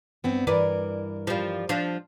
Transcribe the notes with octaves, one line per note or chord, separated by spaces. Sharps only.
G2 B3 C4
G2 E3 A#4 B4 D5
F3 G3
F3 D4